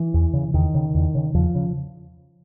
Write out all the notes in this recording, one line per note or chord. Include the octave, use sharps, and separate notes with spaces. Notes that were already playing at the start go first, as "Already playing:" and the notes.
Already playing: E3
E2
C#3
E2 D#3
C#3
E2
C#3
E2 F3
C#3